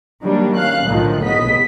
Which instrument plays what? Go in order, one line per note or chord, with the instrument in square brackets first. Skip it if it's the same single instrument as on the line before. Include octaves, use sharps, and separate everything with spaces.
[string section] D#3 F#3 G3 A#3 D4
C#4 F5 F#6
B1 A2 D3 D#3 F3
B3 D#5 B6